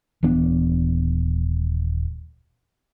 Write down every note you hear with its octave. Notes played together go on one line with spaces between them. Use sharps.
D#1 E3 B3 D4